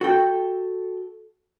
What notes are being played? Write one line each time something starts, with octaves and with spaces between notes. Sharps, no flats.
F#4 A4 G5